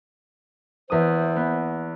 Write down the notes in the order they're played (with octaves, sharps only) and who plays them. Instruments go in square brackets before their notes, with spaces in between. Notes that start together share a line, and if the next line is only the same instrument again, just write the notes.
[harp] E2 D#6 [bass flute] C5
[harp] B3